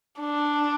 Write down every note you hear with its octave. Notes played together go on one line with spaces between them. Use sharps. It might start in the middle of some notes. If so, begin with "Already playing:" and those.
D4